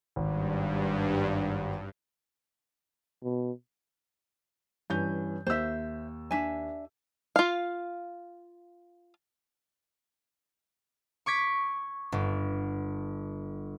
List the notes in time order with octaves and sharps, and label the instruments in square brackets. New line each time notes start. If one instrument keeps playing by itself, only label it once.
[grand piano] G#1 [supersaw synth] G2
[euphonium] B2
[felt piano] G2 E3 G6 [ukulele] C#4
[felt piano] D#2 E6 [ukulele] C5 E5
[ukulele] D4 E5 G#5
[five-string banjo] F4 F5
[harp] C#6 D6 G#6 B6
G1